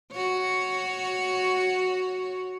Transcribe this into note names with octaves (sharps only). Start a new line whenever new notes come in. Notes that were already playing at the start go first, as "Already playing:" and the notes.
F#4 C#5